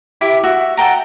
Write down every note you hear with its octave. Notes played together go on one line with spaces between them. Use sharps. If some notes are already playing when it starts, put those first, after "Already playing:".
E4 G4 E5
F#4 E5
A4 F#5 G5 A#5